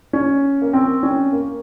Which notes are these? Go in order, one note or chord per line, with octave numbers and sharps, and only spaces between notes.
C#4
A#3
C4
C#4
A#3